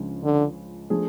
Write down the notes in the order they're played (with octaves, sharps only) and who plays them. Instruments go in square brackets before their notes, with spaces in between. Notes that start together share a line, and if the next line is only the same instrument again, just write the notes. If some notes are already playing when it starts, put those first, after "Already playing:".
Already playing: [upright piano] C#2 C#3 F3 G#3 D4
[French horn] D3
[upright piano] F3 A3 D4 G#4